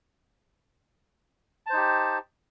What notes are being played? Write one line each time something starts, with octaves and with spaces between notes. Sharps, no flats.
D#4 G4 C5 A5